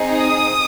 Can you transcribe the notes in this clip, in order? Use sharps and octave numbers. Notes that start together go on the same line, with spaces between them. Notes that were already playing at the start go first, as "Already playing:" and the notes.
Already playing: C4 D#4 G#4
D#6